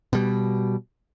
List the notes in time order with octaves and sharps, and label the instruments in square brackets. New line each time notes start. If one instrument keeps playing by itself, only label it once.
[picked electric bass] B2 G3